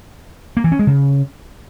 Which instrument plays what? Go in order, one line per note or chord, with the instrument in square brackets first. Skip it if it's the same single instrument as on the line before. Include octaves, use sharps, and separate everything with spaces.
[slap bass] A#3
E3
C#4
G#3
C#3